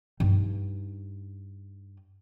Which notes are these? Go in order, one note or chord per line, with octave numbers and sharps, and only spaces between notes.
G2 D#4